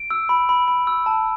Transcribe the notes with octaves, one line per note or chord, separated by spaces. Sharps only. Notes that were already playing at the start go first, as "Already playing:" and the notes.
Already playing: D7
E6
B5
B5
B5
E6
A5